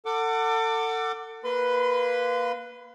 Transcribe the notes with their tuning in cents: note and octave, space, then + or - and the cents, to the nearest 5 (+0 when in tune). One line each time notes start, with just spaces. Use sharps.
A4 +35 F#5 +5 D6 +5
A#3 +0 B4 +0 C6 -40